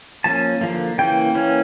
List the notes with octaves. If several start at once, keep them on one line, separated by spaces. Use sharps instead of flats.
F3 A#3 C#4 A5
D3 F3 A#3
C#3 E3 A#3 G5
E3 A#3 C#4